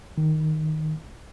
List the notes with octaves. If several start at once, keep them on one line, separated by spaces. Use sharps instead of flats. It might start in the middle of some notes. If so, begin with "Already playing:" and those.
D#3